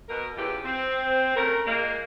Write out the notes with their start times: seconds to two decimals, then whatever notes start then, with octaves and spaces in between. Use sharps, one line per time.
0.08 B2 A#4
0.36 E2 C#3 E3 F4 G4
0.64 C4
1.36 A3 C#4 A#4
1.67 A#2 G#3 A#3